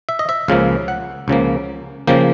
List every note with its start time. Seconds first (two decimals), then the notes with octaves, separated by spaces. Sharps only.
0.09 E5
0.19 D#5
0.29 E5
0.48 C#2 C#3 F3 A#3 F5
0.88 F#5
1.28 C#2 C#3 F3 A#3
2.07 C#3 F3 A#3 G5